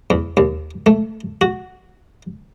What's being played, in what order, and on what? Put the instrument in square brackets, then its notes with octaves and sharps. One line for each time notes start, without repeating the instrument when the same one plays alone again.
[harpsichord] E2
D#2
A3
F#4